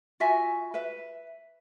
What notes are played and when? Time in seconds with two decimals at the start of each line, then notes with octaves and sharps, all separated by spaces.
0.20 F4 F#4 E5 G#5
0.74 B4 E5